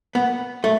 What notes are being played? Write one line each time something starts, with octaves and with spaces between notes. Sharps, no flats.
B3
A3